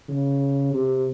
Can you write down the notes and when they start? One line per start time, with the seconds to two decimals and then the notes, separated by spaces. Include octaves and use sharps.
0.09 C#3
0.73 C3